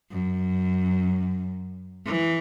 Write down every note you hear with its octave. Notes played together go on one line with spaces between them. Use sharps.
F#2
E3